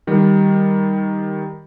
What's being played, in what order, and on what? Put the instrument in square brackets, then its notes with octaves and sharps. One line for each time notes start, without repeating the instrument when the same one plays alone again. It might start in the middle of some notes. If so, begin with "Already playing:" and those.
[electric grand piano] D#3 G3